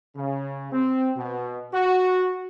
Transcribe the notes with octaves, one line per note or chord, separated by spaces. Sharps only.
C#3
C4
B2
F#4